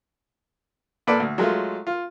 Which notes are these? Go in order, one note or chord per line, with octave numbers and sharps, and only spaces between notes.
A#2 A4 B4 D5
D2
F#3 G#3 A3 F4
F4